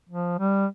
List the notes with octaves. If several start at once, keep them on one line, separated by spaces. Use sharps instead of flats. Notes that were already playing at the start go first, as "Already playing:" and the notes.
F3
G3